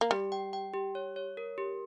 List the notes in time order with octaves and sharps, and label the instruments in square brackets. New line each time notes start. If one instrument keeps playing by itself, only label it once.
[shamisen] A#3
[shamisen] G3 [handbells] G4
[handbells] G5
G5
G4
C#5
C#5
A#4
G4